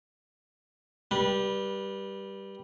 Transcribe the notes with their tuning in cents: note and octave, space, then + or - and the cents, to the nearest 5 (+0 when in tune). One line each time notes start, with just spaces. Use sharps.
G3 +0 B4 -30